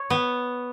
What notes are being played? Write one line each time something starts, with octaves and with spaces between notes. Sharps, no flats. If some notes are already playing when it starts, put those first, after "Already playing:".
Already playing: C#5
B3